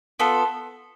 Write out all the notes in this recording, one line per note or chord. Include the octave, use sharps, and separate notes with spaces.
B3 F4 A4